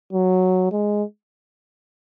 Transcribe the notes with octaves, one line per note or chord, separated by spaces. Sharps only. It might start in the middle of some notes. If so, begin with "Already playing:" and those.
F#3
G#3